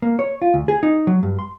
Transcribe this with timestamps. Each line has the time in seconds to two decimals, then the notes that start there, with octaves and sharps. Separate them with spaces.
0.02 A#3
0.19 C#5
0.42 F4
0.54 D2
0.68 G#4
0.83 D#4
1.07 F#3
1.23 G2
1.39 C6